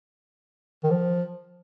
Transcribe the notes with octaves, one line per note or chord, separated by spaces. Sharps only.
D#3
F3